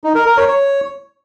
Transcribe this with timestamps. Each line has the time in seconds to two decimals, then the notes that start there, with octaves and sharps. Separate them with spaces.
0.04 D#4
0.15 A#4
0.26 A#4
0.37 C#5
0.48 C#5